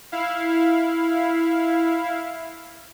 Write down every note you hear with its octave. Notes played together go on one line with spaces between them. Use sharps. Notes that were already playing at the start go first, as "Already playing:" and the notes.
E4 F5